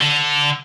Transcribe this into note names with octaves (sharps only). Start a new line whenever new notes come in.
D3